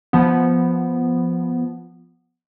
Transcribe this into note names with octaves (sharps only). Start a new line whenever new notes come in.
F3 B3